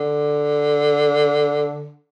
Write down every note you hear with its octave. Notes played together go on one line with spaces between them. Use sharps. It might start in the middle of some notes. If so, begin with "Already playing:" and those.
Already playing: D3